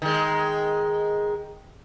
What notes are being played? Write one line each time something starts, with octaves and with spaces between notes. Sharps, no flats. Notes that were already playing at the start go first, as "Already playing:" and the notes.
D#3 G#3